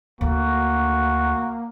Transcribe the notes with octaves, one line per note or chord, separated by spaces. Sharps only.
D2 A#3 F#4